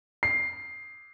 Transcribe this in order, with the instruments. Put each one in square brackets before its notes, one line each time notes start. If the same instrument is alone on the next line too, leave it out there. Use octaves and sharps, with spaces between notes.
[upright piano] C7